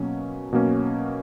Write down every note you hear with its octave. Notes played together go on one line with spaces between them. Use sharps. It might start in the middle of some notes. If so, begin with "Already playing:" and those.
Already playing: B2 F#3 A#3 C#4
B2 F#3 A#3 C#4